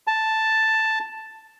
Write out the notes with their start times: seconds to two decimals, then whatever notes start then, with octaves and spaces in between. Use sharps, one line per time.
0.07 A5